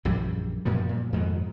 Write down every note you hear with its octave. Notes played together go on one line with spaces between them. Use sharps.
A#1 F#2 E3 G3
F#2 A#2 F3 G3
A#2
F2 G#2 B2 D#3